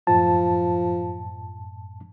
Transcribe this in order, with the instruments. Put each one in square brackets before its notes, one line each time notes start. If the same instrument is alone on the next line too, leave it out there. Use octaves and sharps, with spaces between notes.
[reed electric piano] F#2 A2 A5 [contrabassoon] F3